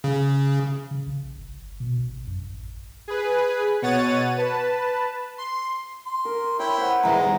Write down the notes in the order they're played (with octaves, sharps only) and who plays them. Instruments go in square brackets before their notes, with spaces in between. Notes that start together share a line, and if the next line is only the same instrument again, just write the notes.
[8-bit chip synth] C#3
[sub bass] C#3
A#1
G1
B2
A1
F#2
A1
[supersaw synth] G#4 B4
B2 C#5 F#5 A6 D#7
B4 A5
C6
[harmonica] C6
[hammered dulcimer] A#4
[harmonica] E4 G5 [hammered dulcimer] C#5
[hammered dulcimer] C5 F#5
[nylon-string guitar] A#2 E3 B4 [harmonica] G#3 [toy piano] A#5
[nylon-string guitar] E2 D#3 G3